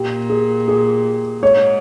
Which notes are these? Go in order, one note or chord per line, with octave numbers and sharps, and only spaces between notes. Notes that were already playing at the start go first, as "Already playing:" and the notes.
Already playing: A#2 G4
G#4
G#4
G#2 C#5